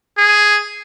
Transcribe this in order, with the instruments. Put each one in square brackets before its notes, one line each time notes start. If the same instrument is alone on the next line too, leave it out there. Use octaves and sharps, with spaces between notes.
[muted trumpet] G#4